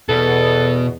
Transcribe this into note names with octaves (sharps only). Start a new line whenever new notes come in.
E2 B2 A4